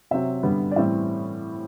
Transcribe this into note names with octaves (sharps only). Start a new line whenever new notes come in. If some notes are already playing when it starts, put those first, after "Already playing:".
C3 F#3 C4 E5
G2 D3 G3 B3
D5
A2 E3 G3 C4 E5